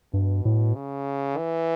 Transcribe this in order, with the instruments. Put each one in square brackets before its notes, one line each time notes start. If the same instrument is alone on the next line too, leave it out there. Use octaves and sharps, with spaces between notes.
[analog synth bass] G2 [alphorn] B2
[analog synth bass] A2
[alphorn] C#3
E3